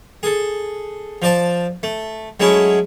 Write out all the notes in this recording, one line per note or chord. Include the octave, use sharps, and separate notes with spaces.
G#4 A4
F3 D5 A5
A3
F#3 G#3 A3 C#4 E4 G#4